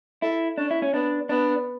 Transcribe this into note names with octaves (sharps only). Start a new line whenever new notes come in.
E4 A4
C#4 D4
E4
C#4
B3 D4
B3 D4